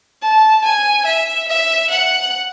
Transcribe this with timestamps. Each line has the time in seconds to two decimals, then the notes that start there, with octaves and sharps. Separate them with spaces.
0.22 A5
0.64 G#5
1.05 E5
1.48 E5
1.90 F#5